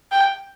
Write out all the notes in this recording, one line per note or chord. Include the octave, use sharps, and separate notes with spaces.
G5